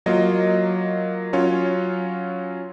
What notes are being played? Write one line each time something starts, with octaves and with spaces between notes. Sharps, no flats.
F#3 A#3 F4 D#5
F#3 C#4 F4 C#5